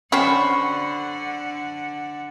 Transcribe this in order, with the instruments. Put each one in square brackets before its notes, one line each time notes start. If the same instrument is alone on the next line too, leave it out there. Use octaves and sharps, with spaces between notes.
[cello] D3 F#5 [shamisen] C#4 F#4 G4 [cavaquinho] C5 B5 [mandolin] C#6